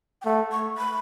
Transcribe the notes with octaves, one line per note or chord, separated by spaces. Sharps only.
G5
A3 F#5
C#6
B5